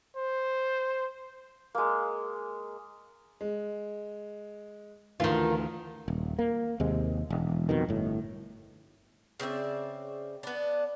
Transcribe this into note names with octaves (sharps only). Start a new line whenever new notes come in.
C5
G#3 A#3
G#3
D2 D#3 E3 F4
D#1
A#3
D#2 C3 G#3
E1
F2 B2 D#3
G1 A2
C#3 C4 D5 E5
B3 D4